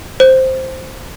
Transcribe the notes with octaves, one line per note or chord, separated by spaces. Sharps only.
C5